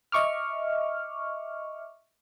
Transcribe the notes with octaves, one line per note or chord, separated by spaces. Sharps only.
D#5 E5 C#6 D6 F6